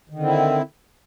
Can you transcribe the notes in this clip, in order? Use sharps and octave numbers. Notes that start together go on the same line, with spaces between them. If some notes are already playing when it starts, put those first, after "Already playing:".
D3 D#3 C4 E4